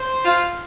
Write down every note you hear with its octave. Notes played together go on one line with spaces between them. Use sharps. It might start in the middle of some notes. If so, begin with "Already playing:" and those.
Already playing: C5
F4